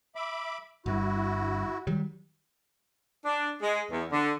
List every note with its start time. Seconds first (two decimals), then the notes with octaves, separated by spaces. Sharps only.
0.15 E5 B5 D6
0.86 G1 G2 E4 F#4
1.87 D#3 F#3 G3
3.25 D4
3.61 G#3
3.91 E2
4.11 D3